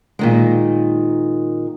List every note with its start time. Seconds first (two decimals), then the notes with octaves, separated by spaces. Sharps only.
0.19 A#2 D#3 G#3